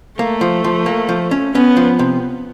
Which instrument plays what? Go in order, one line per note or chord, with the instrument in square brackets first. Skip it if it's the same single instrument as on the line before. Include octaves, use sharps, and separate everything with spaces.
[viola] A3 [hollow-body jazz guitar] A#3
[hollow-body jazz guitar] F3
F3
A#3
F3
C#4
[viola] B3 [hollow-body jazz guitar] C#4
[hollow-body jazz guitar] F3
C3